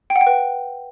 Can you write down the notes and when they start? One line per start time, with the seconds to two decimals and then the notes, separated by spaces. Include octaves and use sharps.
0.10 G5
0.16 F#5
0.21 G5
0.27 B4